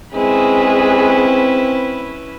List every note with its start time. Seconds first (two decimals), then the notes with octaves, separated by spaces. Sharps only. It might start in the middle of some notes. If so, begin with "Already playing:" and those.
0.14 G#3 C4 C#4 E4 G#4 B4